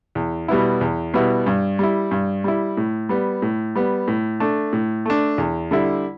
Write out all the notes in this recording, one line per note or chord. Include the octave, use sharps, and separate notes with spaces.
E2
B2 G3 B3 E4
E2
B2 G3 B3 E4
G2
G3 E4
G2
G3 E4
A2
G3 B3
A2
G3 B3
A2
A3 D4
A2
A3 D4
E2
D3 G3 E4